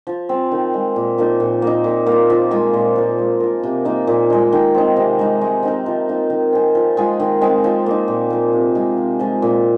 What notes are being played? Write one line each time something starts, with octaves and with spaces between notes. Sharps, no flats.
F3
C4 G#4
D#3
G#3 F4
A#2
F3 A#3 D#4
A#2
A#3 D#4
A#2
A#3
F4
F3
G#3 F4 G#4
A#2
F3 A#3
G#3
F4 A#4
C3
F3 A#3 D#4
A#2
G#3 D#4
D#3
C4 D#4
C3
G#3 D#4
G#3
C4 D#4 A#4
F3
A#3 D#4
D#3
C4 G#4
F3
G#3 F4 G#4
D#3
G#3 C4 G#4
F3
A#3 D#4
A#2
F3 A#3
C3
G#3 F4 G#4
C3
F3 G#3
A#2